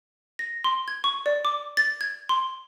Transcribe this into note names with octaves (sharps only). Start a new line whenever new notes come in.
A#6
C6
G#6
C#6
D5
D6
A6
G#6
C6